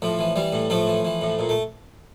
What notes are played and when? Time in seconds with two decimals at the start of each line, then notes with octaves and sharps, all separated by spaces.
0.02 A2 F3
0.19 E3
0.36 E3 G3
0.53 A2
0.70 A2 F3 A3
0.87 E3
1.05 E3
1.21 A2
1.39 A#2
1.49 A3